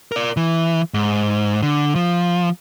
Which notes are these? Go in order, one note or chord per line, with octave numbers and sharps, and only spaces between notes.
A#4 D5
E3
G#2
D3
F3